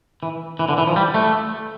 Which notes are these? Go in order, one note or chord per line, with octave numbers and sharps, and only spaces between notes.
E3
E3
D3
E3
F3
G3
A3